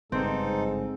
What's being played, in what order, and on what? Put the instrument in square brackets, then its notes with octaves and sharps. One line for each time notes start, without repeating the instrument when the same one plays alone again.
[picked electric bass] G1 C#3 G3 [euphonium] G#2 [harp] C4 [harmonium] D#4 A4